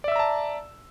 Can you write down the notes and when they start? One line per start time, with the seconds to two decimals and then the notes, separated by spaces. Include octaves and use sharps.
0.04 D5
0.08 E5
0.12 E6
0.16 A#5
0.19 A5